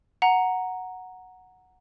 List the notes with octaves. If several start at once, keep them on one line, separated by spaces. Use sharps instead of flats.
F#5 A#5